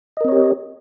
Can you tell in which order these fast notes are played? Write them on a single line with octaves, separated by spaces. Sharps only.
D#5 A#4 C4 C#5 G4